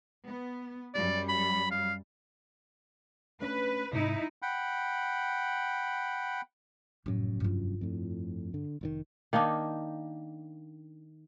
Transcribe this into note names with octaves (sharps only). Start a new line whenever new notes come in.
B3
F#2 G3 D5
B5
F5
A3 C#4 D4 B4
G#2 C3 D#4 E4
F#5 G5 B5
F1 F#2 A2
G2 F4
F2 A2
D3
F1 A2 D#3
D#3 A#3 D4 D#4